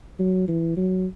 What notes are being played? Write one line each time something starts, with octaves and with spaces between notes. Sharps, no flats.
F#3
E3
F#3